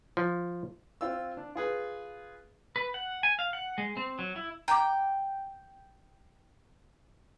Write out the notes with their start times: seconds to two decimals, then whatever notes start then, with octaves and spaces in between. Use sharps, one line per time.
0.17 F3
1.01 C4 F4 E6
1.37 D4
1.55 F4 G#4 B4
2.76 B4
2.94 F#5
3.23 G#5
3.39 F5
3.53 F#5
3.78 G#3
3.97 C4
4.19 F#3
4.36 E4
4.68 G5 A#5 D6